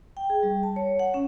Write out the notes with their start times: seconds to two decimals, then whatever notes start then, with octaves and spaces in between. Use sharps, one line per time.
0.17 G5
0.30 G#4
0.43 G3
0.63 A5
0.76 C#5
0.99 F#5
1.14 C#4